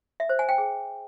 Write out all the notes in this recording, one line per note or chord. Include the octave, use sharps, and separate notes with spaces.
E5
C5
G#5
G5
G#4